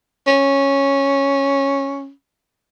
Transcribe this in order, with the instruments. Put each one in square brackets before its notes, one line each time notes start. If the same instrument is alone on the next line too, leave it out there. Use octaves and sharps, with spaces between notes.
[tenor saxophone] C#4